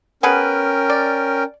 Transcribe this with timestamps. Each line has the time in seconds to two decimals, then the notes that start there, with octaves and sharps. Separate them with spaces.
0.23 B3 C#4 G#4 A#4 B4 G5
0.90 D5